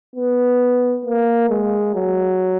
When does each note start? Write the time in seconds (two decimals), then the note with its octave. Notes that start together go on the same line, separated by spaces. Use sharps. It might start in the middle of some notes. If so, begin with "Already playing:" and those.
0.16 B3
1.06 A#3
1.50 G#3
1.95 F#3